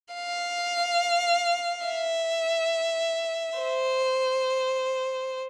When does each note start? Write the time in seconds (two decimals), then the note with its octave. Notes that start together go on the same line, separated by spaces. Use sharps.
0.14 F5
1.86 E5
3.59 C5